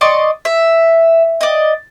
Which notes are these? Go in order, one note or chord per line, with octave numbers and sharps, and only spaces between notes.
D5 D#5 C6 C#6
E5
D5 D#5